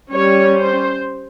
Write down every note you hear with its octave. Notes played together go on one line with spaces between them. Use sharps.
G3 C#4 C#5
C5